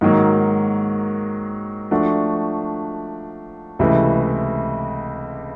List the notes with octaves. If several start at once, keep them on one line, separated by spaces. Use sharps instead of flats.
G#2 D#3 F#3 A#3
F3 A3 D4 F#4
C#2 C3 E3 A3